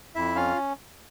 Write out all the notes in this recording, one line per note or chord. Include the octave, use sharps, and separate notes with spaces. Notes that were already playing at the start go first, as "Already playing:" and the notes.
F2 E4 E5
C#4 F4 F5